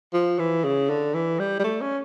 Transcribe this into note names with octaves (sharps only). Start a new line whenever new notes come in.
F3
E3
C#3
D3
E3
G3
G3
A3
C#4